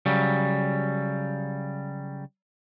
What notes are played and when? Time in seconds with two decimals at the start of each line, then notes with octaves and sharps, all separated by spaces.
0.06 C#3 F#3 G3